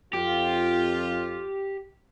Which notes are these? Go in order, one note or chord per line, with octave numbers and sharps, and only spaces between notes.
F2 F4 G4